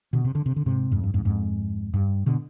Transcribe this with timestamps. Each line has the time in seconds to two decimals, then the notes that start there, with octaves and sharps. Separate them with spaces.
0.13 B2 D3
0.24 C3
0.35 D3
0.46 C3
0.56 D3
0.66 G#2 C3
0.91 F2 G#2
1.03 G2
1.14 F2 G#2
1.25 F2 G#2
1.94 G2
2.26 B2 D3